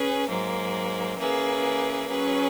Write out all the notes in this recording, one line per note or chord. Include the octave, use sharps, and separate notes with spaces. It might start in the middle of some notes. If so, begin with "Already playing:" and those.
Already playing: C#4 G#4 B4
G#2 F#3 A#3
E3 A#3 C#4 G#4 B4
F#3 C#4 G#4 B4